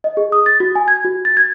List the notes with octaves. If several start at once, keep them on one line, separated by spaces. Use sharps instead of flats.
D#5
G#4
D#6
A6
F#4
G#5
G#6
F#4
A6
G#6